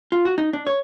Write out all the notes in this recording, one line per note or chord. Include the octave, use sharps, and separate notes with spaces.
F4
F#4
D#4
D4
C#5